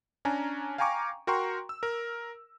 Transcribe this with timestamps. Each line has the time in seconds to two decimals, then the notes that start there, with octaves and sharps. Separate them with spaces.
0.25 C#4 D4 G#5 A#5
0.78 F5 G5 G#5 A#5 C#6 D6
1.27 F#4 A#4 G5 A#5 C6 C#6
1.69 E6
1.83 A#4